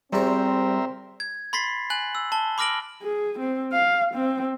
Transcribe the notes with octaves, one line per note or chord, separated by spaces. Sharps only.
E2 F#3 G3 C4 A#4 C5 E5 A#5
G#6
B5 C6 A6 B6 C7
G#5 F#6 F#7
E6
A5 G7
B5 D6 F6 A#6 D7 F#7
G#4
C4
F5
C4